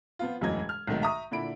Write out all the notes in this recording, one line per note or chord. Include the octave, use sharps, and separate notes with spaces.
F3 B3 F4
E1 F#2 A2 E3 D#5 G#6
F6
B1 G#2 D#3 A3
E5 A#5 C#6 D#6
A#2 D3 E4 B5 D7